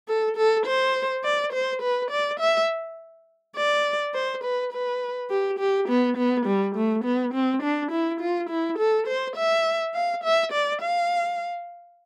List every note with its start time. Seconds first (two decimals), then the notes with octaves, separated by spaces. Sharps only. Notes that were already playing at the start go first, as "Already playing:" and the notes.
0.08 A4
0.37 A4
0.66 C5
1.24 D5
1.53 C5
1.82 B4
2.11 D5
2.40 E5
3.57 D5
4.15 C5
4.43 B4
4.72 B4
5.30 G4
5.59 G4
5.89 B3
6.17 B3
6.46 G3
6.76 A3
7.04 B3
7.34 C4
7.62 D4
7.91 E4
8.20 F4
8.50 E4
8.79 A4
9.07 C5
9.37 E5
9.94 F5
10.24 E5
10.52 D5
10.81 F5